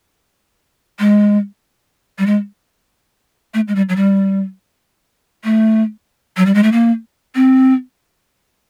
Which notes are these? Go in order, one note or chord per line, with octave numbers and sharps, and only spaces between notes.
G#3
G3
G#3
A3
G#3
G3
F#3
G3
A3
F#3
G3
G#3
A3
A#3
C4